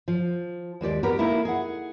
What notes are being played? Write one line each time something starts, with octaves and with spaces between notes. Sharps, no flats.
F3
D#2 G#3 G4 D5
B3 G4 A#4
A#3 D#4 E4 A4
G#4 F#5